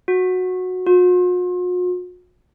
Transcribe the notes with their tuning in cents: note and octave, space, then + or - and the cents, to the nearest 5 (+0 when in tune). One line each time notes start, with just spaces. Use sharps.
F#4 -10
F#4 -45